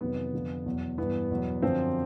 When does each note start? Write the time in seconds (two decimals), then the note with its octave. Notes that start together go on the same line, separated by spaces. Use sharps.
0.01 F2 C3 D#3 F#3 B3 B4
0.34 F2 D3 F3
0.66 E2 B2 F#3
0.98 G2 E3 B3 B4
1.31 E2 B2 F#3
1.62 F#2 D3 F3 C4 C5